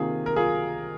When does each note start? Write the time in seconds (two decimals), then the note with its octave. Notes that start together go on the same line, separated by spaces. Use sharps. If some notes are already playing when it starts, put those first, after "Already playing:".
Already playing: C3 D#3 A#3 F4 G#4
0.26 A#4
0.36 F4 G#4